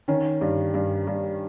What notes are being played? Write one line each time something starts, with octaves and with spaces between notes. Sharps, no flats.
D#3 C#4
G2
G2
G2